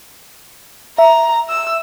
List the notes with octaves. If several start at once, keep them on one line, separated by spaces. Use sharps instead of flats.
E5 A#5
E6